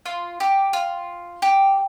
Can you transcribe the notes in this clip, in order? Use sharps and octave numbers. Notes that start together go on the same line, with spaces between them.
F4
G4
F4
G4